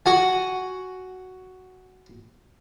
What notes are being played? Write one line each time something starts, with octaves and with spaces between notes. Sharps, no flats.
F#4 F#5 G#5